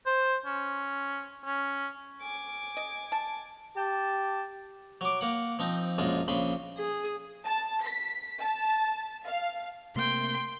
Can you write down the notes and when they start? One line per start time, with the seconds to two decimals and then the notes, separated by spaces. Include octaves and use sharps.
0.06 C5
0.46 C#4
1.45 C#4
2.22 G#5 D6
2.77 D#5
3.12 A5
3.76 G4 G5 A5
5.01 F#3 D6
5.21 A#3 F#5
5.59 F3 C4 D#4
5.98 A#1 F#2 G#3 F4
6.28 A#1 C#3 B5 C6
6.78 G#4
7.46 A5
7.83 B6
8.41 A5
9.25 F5
9.96 C3 A3 A#3 G5 C6